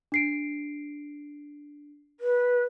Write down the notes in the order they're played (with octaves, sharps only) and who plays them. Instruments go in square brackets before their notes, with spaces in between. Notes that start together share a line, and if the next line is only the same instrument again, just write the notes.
[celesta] D4 C7 D7
[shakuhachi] B4